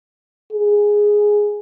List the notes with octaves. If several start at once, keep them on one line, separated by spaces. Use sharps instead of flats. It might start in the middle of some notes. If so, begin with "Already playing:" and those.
G#4